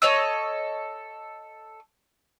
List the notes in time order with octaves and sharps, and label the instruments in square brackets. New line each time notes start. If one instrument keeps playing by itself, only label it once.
[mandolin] A4 C#5 D#5 E6